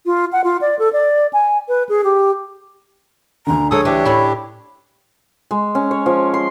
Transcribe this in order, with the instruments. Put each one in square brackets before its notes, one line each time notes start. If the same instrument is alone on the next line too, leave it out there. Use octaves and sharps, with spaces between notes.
[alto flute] F4
F#5
F4
D5
A4
D5
G#5
B4
G#4
G4
[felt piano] D2 D3 [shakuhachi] A#5
[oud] F#3 G#3 [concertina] A4 D#6 [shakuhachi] C#5
[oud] E3 [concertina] D4 G4
[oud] A2 C#4 E4
[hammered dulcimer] G#3
C#4
C#5
F3
C6